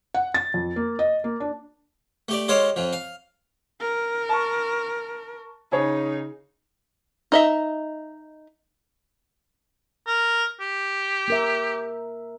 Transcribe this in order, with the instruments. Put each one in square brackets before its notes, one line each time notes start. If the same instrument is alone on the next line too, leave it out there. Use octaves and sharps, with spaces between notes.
[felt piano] F#5
A6
F2
A#3
D#5
A#3
D4
[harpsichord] A3 G4 D5
G#3 G4 A4 C5 C#5 F5
F2 F3
F5
[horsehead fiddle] A#4
[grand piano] A5 C#6
[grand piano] C#3 G#4 C#5 [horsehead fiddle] D#4
[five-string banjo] D#4 D#5 E5
[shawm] A#4
G4
[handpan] A#3 A#4 E5